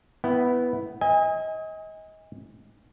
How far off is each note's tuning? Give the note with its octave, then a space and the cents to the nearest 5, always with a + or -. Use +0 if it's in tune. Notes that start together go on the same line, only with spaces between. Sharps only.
B3 +0 E4 -5 G5 -35
D#5 +30 G#5 -30